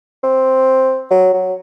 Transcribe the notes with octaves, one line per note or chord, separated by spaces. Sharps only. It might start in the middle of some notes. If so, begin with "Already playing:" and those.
C4
F#3
F#3